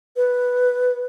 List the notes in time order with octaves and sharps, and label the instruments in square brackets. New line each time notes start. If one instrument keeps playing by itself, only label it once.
[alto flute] B4